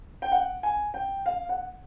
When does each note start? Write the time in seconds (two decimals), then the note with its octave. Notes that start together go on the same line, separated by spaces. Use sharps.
0.22 G5
0.32 F#5
0.63 G#5
0.94 G5
1.26 F5
1.49 F#5